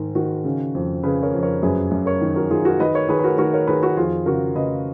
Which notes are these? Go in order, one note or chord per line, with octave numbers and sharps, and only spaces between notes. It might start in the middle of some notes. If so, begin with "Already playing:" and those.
Already playing: G#2 D#3 A#4
D#3 F#4 A#4
C#3
F2
C#3 G#4 B4
A#4 C#5
F2
A#4 C#5
F#2 G#4 B4
F#2
A#4 C#5
D#3
F#4 A#4
D#3 F4 G#4
F#4 A#4
D#3 B4 D#5
A#4 C#5
D#3 G#4 B4
B4
F#4 A#4
D#3 F#4 A#4
A#4 C#5
D#3 G#4 B4
F#4 A#4
F2 F4 G#4
C#3 F#4 A#4
C#3 B4 D#5